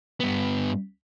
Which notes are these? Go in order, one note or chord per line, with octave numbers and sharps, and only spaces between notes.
G2 B3